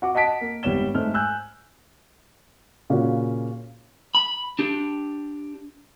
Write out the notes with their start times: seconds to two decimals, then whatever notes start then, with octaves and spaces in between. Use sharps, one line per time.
0.02 F#4 F#5 D6
0.15 D#5 F#5 A5 B6 D7
0.41 A#3
0.63 G#1 G3 B3 C#5 E7 G7
0.94 G#2 A3 F6
1.14 G#5 E6 F#6 G6
2.90 A#2 C#3 A#3 C#4 F4 F#4
4.15 B5
4.59 D4 G4